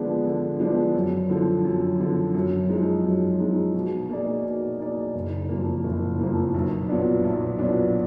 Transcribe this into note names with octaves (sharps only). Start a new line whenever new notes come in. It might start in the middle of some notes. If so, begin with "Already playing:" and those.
Already playing: D3 F3 G#3 B3 D4
D3
F3 G#3 B3 D4
F#2
D3 F3
F#2
D3 F3
F#2
F3 G#3 D#4
F#2
F3 G#3 D#4
B2
A#3 D#4 G#4 D5
B2
A#3 D#4 G#4 D5
F#1
F2 F3 A#3
F#1
F2 F3 A#3
B1
A#2 F#3 B3 D4
B1
A#2 F#3 B3 D4